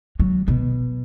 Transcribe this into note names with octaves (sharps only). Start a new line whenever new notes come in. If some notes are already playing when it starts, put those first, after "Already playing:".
F#3
B2